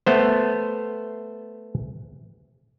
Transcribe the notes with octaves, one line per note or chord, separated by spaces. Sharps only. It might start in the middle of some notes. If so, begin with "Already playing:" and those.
A3 B3 C5